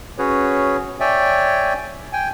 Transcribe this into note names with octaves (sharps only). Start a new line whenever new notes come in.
C#4 F#4 G#4 B4 C#5
C#5 D5 E5 G5 G#5
G5 G#5